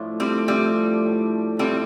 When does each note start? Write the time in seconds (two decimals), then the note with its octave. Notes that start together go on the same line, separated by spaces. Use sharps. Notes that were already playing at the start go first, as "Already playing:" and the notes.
Already playing: A2 F3 A3 D4
0.20 G3 C4
0.48 A2 F3 G3 A3 C4 D4
1.04 A2 F3 A3 D4
1.59 A2 F3 G3 A3 C4 D4